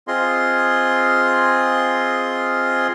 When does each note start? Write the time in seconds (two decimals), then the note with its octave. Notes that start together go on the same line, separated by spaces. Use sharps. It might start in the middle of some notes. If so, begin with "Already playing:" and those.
0.08 C4 F4 G#4 D#5 C6